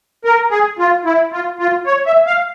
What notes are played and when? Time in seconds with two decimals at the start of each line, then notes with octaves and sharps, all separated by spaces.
0.25 A#4
0.51 G#4
0.79 F4
1.05 E4
1.32 F4
1.59 F4
1.87 C#5
2.06 E5
2.27 F5